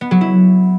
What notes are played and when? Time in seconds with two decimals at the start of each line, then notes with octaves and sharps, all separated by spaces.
0.01 B3
0.11 F#3
0.21 E4